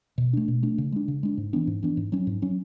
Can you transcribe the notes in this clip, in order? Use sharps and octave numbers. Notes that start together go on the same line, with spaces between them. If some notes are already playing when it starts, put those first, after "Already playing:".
B2
A3 D4
B2
A3 D4
C#3
G#3 D4
C#3
G#3 D4
G#2
E3 B3 D4
G#2
E3 B3 D4
G#2
F#3 C#4
G#2
F#3 C#4